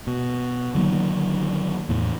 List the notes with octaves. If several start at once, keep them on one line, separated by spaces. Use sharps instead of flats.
B2
D3 D#3 F#3 A#3
E2 A2